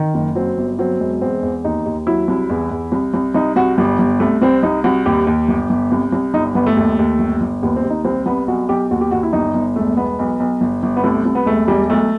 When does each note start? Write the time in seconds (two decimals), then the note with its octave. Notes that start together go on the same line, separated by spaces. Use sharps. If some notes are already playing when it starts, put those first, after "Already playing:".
Already playing: D#3
0.14 F#1
0.35 F#3 C4
0.58 G1
0.79 F#3 C4
1.00 E1
1.21 E2 C4
1.43 E2
1.64 D#2 D#4
1.86 D#2
2.07 F#3 E4
2.28 C2
2.50 E2
2.71 E2
2.92 C2
3.14 C2
3.34 C2 D#4
3.56 C2 F#4
3.78 G1 G3
3.99 G1
4.20 C2 A3
4.42 C2 C4
4.63 C2 D#4
4.84 C2 F#4
5.06 D#2 G4
5.27 D#2
5.48 G1
5.70 G1
5.92 C2
6.12 C2
6.34 G1 D#4
6.55 G1 B3
6.66 A3
6.77 D#2
6.99 D#2
7.19 G1
7.41 G1
7.63 D#2 B3
7.76 C4
7.84 D#2
7.90 D#4
8.05 C2 C4
8.26 C2 B3
8.47 B1 F#4
8.69 B1 G4
8.91 D#2 F#4
9.01 G4
9.11 D#2 F#4
9.23 E4
9.33 G1 D#4
9.54 G1
9.76 E1 A3
9.97 E1 B3
10.19 B1
10.40 B1
10.61 G1
10.83 G1
10.97 B3
11.04 C2 A3
11.25 C2
11.35 B3
11.46 E1 A3
11.68 E1 G3
11.90 B1 A3